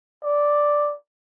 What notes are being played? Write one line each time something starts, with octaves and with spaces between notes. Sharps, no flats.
D5